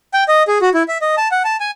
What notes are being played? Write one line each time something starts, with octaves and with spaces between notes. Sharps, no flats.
G5
D#5
G#4
F#4
E4
E5
D#5
A5
F#5
A5
G#5